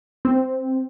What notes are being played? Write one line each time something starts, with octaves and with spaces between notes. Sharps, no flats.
C4